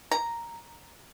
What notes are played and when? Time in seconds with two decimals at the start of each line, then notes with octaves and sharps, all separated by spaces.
0.11 A#5